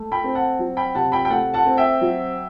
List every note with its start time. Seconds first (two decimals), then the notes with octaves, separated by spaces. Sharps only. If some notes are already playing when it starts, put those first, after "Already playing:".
Already playing: A3
0.12 G5 B5
0.24 C4
0.35 F#5 A5
0.59 F#3
0.77 G5 B5
0.94 C3 F#5 A5
1.12 G5 B5
1.25 G5
1.30 A3 F#5 A5
1.54 F#5 A5
1.66 C4
1.77 E5 G5
2.01 F#3